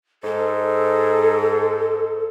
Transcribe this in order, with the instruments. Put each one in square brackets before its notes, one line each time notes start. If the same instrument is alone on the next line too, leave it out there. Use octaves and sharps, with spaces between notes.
[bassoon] G#2 [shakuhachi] A4